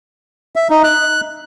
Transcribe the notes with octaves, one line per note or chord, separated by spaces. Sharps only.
E5
D#4
F#6